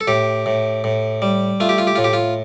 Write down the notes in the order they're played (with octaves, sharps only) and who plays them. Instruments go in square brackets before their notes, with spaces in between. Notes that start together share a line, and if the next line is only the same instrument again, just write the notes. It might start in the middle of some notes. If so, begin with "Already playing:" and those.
[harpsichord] A4
A2 G4
A2
A2
G3
A3 F4
G4
F4
G4
A2 F4
G4
F4